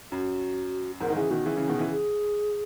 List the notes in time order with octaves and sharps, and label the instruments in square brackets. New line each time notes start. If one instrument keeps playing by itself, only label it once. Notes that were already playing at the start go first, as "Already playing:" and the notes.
[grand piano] F#2 [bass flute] F#4
[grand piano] E2 G#2 [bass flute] A#4
[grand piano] D#3
[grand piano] C#3 E3 [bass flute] G#4
[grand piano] B2 D#3 [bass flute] F#4
[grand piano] C#3 E3 [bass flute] G#4
[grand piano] C#3 E3
B2 D#3
C#3 E3
[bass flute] G#4